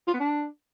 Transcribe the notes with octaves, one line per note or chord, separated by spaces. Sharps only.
F4
B3
D4